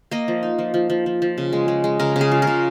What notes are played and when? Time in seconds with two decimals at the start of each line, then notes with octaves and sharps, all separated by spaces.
0.11 A#3 D#5
0.28 F3
0.43 D#4
0.59 F3
0.74 F3
0.90 F3
1.06 F3
1.22 F3
1.38 C#3
1.53 G#3
1.68 G#3
1.84 G#3
2.00 C#3 A#4
2.16 C#3
2.21 G#4
2.32 F4
2.42 A#4
2.47 C#3